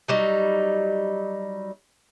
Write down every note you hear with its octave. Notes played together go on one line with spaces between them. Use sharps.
F#3 G3 D#4